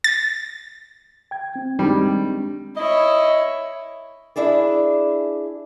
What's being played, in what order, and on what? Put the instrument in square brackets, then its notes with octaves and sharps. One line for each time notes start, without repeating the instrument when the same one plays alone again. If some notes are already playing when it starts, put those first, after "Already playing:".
[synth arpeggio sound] A6
[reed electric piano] G5 G#6
C4
[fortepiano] D#3 G3 [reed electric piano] G#3 C4 D4
[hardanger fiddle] E4 C#5 [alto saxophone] D#5
[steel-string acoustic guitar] D4 E4 G#4 D5